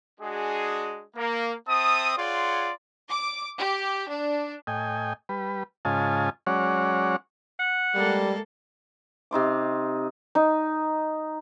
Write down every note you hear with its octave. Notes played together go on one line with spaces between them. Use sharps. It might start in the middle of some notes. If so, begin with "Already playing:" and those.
G#3 D4 F#4 G#4
A#3
C4 E5 A5 D#6
F4 G#4 C#5 D5 F#5 C6
D6
G4
D4
A2 D#5 G5 G#5
G3 B4
G#2 C#3 F4 D#5 G#5 A5
F#3 G#3 C#4 C#5 D5 F#5
F#5
G3 G#3 A#3 A4
C3 D#4 C6 D6
D#4